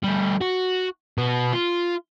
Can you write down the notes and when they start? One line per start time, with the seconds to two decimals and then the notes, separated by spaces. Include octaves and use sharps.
0.03 G3 A3
0.41 F#4
1.18 B2 B3
1.53 F4